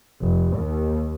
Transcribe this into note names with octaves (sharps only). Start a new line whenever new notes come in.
F1
D#2